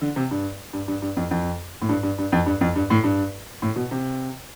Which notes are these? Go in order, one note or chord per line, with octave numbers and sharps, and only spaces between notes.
D3
C3
G2
G2
G2
G2
F2
F2
A2
G2
G2
G2
F2
G2
F2
G2
A2
G2
A2
B2
C3